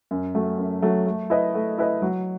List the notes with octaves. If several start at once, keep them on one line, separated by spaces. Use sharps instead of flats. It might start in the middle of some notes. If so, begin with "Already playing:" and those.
F#2
F#3 A3
F#2
F#3 A3
A3
E4 B4 D#5
A3
E4 B4 D#5
F#3